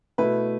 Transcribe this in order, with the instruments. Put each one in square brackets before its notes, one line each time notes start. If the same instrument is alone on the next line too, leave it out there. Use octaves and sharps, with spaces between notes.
[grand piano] B2 A3 E4 [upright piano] B4